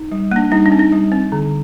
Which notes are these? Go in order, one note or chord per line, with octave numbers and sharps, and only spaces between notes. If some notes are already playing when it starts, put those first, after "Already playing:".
Already playing: D#4
G3
A#3 D4
G3 D#4
D4
C4
D#4
G3
C4
D3